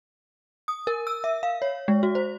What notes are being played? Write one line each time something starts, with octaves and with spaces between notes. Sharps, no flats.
D#6
A#4
E6
E5
F5
C#5
G#3
F#4
C5